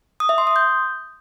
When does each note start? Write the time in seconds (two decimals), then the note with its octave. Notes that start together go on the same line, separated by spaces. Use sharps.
0.20 D#6
0.29 E5
0.38 C6
0.47 D#6
0.56 G6